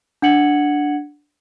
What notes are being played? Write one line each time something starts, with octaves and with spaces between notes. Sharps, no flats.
D4 F#5 G#6 C#7 F#7